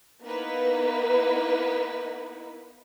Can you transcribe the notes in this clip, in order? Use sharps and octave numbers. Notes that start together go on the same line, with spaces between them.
A#3 B3 D#4 E4 B4